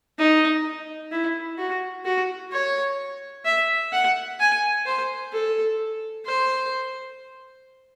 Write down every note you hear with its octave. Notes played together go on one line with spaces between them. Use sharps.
D#4
E4
F#4
F#4
C#5
E5
F#5
G#5
C5
A4
C5